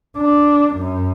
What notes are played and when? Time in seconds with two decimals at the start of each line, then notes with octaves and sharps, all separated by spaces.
0.17 D4
0.75 F#2